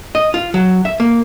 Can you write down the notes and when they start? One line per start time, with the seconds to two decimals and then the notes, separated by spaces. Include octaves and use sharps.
0.15 D#5
0.34 F4
0.54 F#3
0.85 E5
1.00 A#3